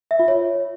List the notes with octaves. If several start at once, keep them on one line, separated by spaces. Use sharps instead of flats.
E5
F4
C#5